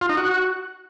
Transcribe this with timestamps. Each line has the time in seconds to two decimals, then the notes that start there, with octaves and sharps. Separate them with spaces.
0.01 F4
0.09 D#4
0.17 F#4